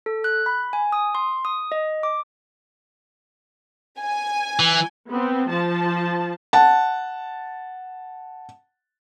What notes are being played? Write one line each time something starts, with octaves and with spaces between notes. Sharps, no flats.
A4
F#6
B5
G#5
D#6
C6
D#6
D#5
D6
G#5
E3
B3 C4
F3 A5
F#5 A5